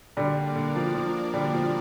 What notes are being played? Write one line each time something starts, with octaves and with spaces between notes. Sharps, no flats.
D3 G3 A#3 D4 A#4 D5
D3
F3
F3
D3 G3
F3